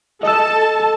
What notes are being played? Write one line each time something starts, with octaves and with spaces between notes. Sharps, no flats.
A4 D#5 A5 E6